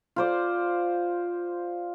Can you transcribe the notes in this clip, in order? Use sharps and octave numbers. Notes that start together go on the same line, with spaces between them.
F4 C5 D5